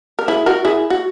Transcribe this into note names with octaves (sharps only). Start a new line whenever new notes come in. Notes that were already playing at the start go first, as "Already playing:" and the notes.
A#4
E4 G#4
F#4 A#4
E4 G#4
F#4